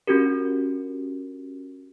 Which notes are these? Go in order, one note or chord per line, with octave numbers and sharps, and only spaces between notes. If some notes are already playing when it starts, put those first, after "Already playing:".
C#4 D4 F#4 G4 A#4